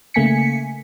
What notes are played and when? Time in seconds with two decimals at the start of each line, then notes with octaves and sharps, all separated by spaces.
0.14 C#3 A3 A#3 G#5 B6 C#7